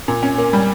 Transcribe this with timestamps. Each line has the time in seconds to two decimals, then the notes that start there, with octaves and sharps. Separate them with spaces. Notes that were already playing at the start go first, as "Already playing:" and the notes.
0.08 A#2
0.23 C#4
0.38 A#3
0.53 G3